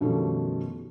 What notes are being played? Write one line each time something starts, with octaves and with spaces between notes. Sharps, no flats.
F#2 B2 D#3 F3 G3 A3